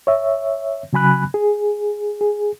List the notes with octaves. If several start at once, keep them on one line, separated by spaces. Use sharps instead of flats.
C#5 E5
C#3 F#3 G#5 B5 F#6
G#4
G#4